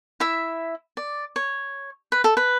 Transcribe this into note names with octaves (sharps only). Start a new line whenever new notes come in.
E4 E5
D5
C#5
B4
A4
B4